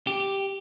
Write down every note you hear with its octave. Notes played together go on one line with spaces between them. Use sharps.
G4